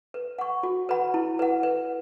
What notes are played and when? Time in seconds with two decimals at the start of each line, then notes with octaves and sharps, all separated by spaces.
0.14 B4
0.38 F#5 C#6
0.63 F#4
0.89 B4 F#5 B5
1.14 E4
1.39 B4 F#5
1.63 B4